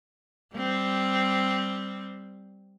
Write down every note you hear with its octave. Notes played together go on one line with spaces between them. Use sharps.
G3 C4